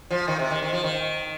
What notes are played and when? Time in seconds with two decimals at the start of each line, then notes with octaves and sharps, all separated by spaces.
0.11 F3
0.28 D#3
0.39 C3
0.51 D#3
0.62 D#3
0.73 F3
0.84 D#3